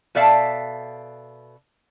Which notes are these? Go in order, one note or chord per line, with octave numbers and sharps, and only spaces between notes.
B2 A4 D5 E5 F5 A5